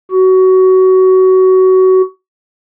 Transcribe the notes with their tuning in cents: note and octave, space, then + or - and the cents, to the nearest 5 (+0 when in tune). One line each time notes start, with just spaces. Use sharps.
F#4 +20